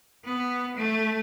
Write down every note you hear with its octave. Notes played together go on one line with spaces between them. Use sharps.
B3
A3